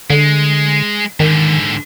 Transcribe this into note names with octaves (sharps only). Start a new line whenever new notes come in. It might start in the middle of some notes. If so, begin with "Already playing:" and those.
D3 G#3
G#2 D3 D#3